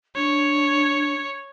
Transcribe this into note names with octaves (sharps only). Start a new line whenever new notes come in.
D4 C#5